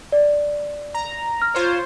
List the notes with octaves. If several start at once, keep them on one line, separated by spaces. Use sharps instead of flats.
D5
A#5
F6
F4 C5 C#5